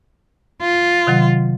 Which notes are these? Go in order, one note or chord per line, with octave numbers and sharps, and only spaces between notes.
F4
C3 D#3 F#3